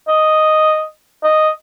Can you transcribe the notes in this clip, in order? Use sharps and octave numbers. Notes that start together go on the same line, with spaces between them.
D#5
D#5